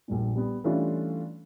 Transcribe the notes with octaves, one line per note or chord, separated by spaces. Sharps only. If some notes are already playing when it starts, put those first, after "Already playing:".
A#1 G2 A#2
G3 B3
E3 G3 A3 C#4 D4 F4